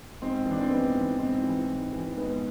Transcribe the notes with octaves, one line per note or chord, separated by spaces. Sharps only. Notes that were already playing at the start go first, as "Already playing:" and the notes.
G#2 C4
E3 D4
C4
G#2 B3
E3
G#2 C4
E3
G#2
E3
G#2 B3